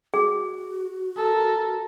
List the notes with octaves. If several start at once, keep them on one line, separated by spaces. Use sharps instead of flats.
F#4 G#4
A4 A#4